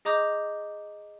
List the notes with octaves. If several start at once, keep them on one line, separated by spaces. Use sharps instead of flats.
G#4 D#5 A#5 D6 D#6 G6